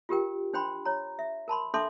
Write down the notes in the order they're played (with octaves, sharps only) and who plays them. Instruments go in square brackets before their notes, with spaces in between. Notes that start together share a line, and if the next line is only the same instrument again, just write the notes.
[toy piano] F4 G4 A#4 G5
D4 C5 G5 B5 C6
C#5 A#5
E5
A#4 A5 B5 C6
D4 A4 E5 A5 C6 D6